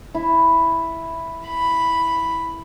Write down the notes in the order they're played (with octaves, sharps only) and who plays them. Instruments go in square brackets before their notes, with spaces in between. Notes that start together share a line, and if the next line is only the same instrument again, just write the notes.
[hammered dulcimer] E4
[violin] B5